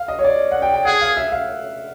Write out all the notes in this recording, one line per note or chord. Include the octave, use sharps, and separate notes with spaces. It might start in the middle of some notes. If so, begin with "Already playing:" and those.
Already playing: F5
D#5
C#5
D5
F#5
G5
G5
G#4 F#5
F5
E5
F5